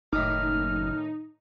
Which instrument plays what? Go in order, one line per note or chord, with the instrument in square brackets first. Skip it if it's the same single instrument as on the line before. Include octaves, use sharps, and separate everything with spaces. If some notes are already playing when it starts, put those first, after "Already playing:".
[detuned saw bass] F#1 [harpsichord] A2 D#3 D6 [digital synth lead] D#4 [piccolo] F6